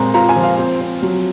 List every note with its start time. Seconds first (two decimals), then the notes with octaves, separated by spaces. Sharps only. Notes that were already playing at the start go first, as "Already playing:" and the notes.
Already playing: A#2 G#3 C4 A#5 C6
0.14 F4 A#5
0.29 G#5
0.36 F3
0.43 F5
0.59 C4
0.81 C4
1.02 F#3